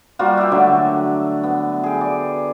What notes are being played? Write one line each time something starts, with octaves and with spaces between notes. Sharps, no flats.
G3 A#3 F4 F#4
E5 G5
D3 F#3 A3
B3
G#4 G5
D5